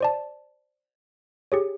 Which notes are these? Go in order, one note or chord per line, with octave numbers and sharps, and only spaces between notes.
C5 D5 A5
G4 G#4 C#5